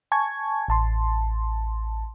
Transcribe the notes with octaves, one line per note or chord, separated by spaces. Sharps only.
G#5 A5 C#6 G#6
A1 A5 C6